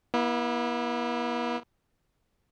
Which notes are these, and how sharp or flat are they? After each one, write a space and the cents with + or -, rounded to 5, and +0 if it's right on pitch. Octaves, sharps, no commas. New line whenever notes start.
B3 -45 E4 +0